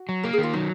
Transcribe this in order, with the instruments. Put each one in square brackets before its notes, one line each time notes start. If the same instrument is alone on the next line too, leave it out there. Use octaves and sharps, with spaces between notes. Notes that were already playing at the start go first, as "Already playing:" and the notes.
Already playing: [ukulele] F#4
[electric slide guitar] F#3
[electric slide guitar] A#3 [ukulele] A#4
[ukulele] G#4
[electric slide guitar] D#3
[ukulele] F4
[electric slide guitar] F#3 [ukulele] D#4